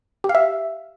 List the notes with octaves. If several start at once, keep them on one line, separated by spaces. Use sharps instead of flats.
G4
F5
E5